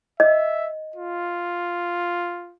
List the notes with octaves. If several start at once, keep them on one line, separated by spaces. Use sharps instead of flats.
D#5 E5
F4